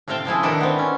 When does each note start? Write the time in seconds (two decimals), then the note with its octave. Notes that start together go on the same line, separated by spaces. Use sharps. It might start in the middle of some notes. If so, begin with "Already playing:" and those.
0.08 A2 C3 C4 F5 G5 A5
0.25 A2 F3 E4 G#4
0.43 D#3 D4 E4 G4 A4 B4
0.61 B3 C4
0.79 C#4